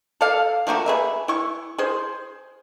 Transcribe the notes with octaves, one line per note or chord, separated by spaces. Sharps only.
A4 D5 F5
F3 A3 A#3 F#4
G#4 B4 E5
E4 C#6
G#4 C5